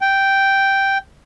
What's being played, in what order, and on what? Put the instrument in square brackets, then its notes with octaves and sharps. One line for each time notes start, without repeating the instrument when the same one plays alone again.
[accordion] G5